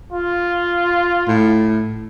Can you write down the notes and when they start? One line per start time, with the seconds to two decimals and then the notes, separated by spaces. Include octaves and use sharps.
0.12 F4
1.28 A2